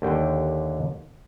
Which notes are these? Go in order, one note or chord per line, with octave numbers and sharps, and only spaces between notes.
D#2 D3 G5